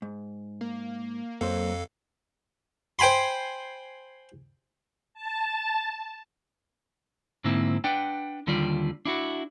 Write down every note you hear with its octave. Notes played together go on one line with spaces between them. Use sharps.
G#2
A#3
F2 F#3 A#3 A4 C5 F5
C5 G5 G#5 B5 C6
A5
G#2 D3 A#3 C4 E4
D4 B4 D5 F#5 G5
D#2 D3 G3 F4 D5
D4 E4 F#4